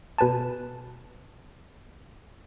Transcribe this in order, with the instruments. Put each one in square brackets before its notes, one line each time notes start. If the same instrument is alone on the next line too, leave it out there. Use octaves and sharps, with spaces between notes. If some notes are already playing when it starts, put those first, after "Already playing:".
[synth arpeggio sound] B2 B4 G#5 A5